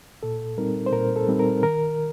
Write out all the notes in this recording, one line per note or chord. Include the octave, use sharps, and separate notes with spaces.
A#2 A4
G3 C4 D#4 A#4
C5
A#2 A#4
A4
G3 C4 D#4
A#4
D#3 A#4